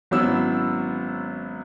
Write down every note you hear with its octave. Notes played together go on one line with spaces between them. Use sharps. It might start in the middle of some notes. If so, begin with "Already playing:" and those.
G#1 F#3 B3 C#4 E4 E6